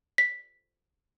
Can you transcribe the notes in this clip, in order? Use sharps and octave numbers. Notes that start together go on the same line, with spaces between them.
B6